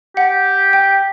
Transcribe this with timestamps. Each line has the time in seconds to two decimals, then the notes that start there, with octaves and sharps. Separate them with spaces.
0.16 G4 F#5
0.73 G5